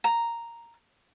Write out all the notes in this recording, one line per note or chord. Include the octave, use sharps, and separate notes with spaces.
A#5